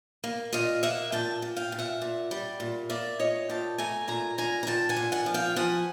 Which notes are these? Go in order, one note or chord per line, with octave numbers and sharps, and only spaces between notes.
A#3
A#2 D#5 F5
A#3 E5 F#5
A#2 G5 A5
A#2
F5 G5
A#2
E5 F#5
A#2
G3
A#2
A#3 D5 E5
A#2 C#5 D#5
A#2 G5 A5
A3 G#5 A#5
A#2 G#5 A#5
A#2 G#5 A#5
A#5
A#2 G5 A5
F#5 G#5
A#2
F#5 G#5
F3
F5 G5
F3 F#5 G#5